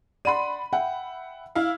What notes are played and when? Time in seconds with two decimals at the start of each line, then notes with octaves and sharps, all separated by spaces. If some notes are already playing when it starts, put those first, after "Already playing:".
0.25 D5 F#5 B5 C6 D#7
0.73 E5 F#5 G5
1.55 E4 F5